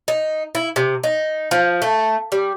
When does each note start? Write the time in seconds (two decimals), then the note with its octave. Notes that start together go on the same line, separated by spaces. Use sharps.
0.08 D#4
0.55 E4
0.76 C3
1.03 D#4
1.51 F3
1.82 A3
2.32 G3